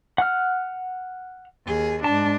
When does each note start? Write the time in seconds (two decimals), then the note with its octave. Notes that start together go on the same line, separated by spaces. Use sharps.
0.18 F#5 F6
1.66 D#2 G#4
2.04 G#2 D4 A5